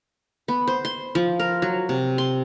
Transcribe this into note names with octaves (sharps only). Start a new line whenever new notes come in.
B3
C5
C6
F3
A#4
F#3
C3
C6